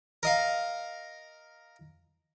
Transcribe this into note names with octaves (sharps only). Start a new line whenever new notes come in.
A#4 D#5 F5